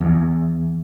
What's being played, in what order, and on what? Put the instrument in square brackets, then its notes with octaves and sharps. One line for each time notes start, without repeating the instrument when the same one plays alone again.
[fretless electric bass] E2